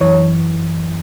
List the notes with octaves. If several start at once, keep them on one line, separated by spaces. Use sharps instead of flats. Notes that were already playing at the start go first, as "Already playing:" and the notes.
F#2 E3 C#5